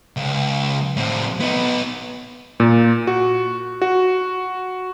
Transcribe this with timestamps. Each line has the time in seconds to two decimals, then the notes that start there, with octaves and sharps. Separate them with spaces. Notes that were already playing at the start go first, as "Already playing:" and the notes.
0.17 C#2
0.97 A2 C4
1.41 B3 D#4
2.60 A#2
3.07 F#4
3.82 F#4